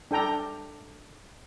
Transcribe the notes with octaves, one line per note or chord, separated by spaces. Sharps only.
D4 A4 G5 A#5